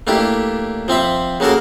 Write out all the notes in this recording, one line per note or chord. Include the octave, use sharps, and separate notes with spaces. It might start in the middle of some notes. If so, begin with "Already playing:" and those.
A3 A#3 D4 E4 G4
F3 C4 E5 B5
C#3 A#3 F#4 A4 A#4